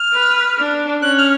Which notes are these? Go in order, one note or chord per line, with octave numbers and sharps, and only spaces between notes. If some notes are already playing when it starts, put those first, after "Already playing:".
Already playing: F6
B4
D4
C#4 F#6
F6